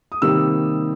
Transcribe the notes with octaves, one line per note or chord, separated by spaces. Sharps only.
D#6
C3 D#3 G3 A#3 E6